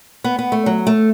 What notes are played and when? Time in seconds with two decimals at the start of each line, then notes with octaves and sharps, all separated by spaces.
0.24 B3
0.39 B3
0.52 A3
0.66 F#3
0.87 A3